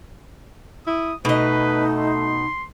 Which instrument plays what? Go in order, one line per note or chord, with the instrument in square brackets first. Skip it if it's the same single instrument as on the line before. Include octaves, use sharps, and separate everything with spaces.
[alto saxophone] E4 [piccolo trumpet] D#6
[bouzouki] B2 D#5 [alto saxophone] A3 [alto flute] D#4 [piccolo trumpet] B4
[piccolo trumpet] C6